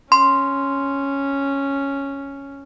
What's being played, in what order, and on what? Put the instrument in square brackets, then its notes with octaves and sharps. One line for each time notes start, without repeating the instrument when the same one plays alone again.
[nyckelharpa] C#4 [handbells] C6